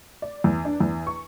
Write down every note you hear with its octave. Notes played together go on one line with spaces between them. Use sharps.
D5
E2
D4
E2
C#6